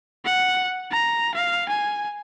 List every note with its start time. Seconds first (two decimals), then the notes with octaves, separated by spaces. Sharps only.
0.25 F#5
0.91 A#5
1.34 F5
1.68 G#5